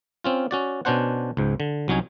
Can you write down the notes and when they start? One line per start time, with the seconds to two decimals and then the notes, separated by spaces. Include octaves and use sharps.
0.24 C4 C#4 F4
0.51 C#4 F#4 D5
0.85 B2 C#4 D4 C5 F#5
1.37 C#2 G#2
1.60 D3
1.88 C2 F#3 C#4 D#4 G#5